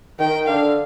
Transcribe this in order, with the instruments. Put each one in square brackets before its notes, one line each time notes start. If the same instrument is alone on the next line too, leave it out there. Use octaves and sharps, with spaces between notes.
[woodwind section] D#3 [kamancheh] G5
[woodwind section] D3 [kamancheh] F5